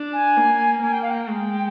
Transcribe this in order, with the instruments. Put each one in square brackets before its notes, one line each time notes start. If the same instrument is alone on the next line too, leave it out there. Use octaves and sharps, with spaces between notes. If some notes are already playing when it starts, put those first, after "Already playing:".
Already playing: [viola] D4
[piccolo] G#5
[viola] A#3
[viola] A#3 [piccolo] G#5
[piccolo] G5
F5
G5
[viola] G#3